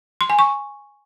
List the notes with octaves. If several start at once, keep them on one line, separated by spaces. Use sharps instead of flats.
C6
G#5
C#6